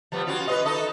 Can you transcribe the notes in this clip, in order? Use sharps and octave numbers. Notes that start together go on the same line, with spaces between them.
F3 G3 B3
C#4 F4 F#4
B4 C5 D#5
D#4 A4 D#5